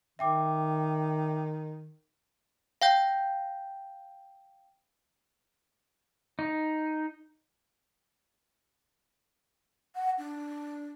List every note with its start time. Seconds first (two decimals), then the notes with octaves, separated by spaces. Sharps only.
0.19 D#3 E5 G5 D6
2.82 F5 G5 G6
6.39 D#4
9.95 F#5
10.18 D4